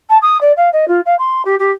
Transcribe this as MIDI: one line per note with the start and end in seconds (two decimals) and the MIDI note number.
0.09 0.18 81
0.22 0.40 87
0.41 0.52 74
0.56 0.69 77
0.73 0.88 75
0.88 1.00 65
1.05 1.15 77
1.19 1.42 84
1.45 1.55 67
1.59 1.71 67